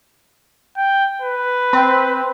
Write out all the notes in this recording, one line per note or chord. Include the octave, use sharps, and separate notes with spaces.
G5
B4
C4